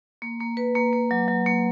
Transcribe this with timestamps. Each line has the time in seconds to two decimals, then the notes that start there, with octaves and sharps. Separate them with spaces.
0.22 A#3
0.40 A#3
0.57 B4
0.75 A#3
0.93 A#3
1.11 F#3
1.28 F#3
1.46 A#3